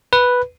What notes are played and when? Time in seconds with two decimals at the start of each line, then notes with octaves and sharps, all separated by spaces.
0.13 B4